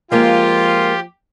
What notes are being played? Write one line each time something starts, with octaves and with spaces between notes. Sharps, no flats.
F3 G#3 A#3 F4 G4 F5